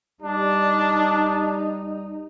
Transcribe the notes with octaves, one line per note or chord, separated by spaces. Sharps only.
G3 D4 D#4